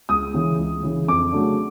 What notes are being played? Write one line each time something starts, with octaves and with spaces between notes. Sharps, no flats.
C#2 D#6
C#3 E3
C#2
C#3 E3
F2 D6
C#3 F#3 A3 D4